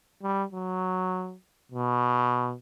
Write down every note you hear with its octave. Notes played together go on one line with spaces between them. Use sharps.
G3
F#3
B2